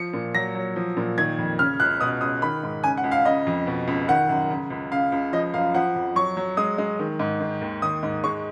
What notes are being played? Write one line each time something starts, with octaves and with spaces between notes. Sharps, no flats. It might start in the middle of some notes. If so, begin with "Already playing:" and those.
Already playing: F3 C#7
A#2
F#3 A#6
F#3
F3
A#2
D#3 G#6
F2
C#3 F6
C#2 F#6
B2 D#6
C#2 D#6
D#3 B5
G#2
C#3 G#5
F#5
C#2
F5
C#3 D#5
F2
B2
C#2
D#3 F#5
F#2
C#3
C#2
C#3 F5
C#2
F3 D#5
F#2 F5
F3 F#5
F2
F#3 C#6
F#3
G#3 D#6
G#3
D#3
G#2
D#3
D#2
D#3 D#6
G#2
G#3 C#6